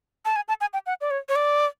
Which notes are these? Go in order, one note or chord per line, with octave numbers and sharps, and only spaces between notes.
A5
G#5
A5
G#5
G5
F#5
D5
C#5
C#5
D5